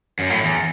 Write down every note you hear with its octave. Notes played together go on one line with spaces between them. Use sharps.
F#2
A2
E2